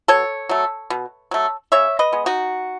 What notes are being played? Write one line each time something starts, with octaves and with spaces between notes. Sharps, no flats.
B2 A4 C#5
F#3 A3
B2
F#3 A3
C#3 C#5 E5
B4 D#5
G#3 B3
D#4 F#4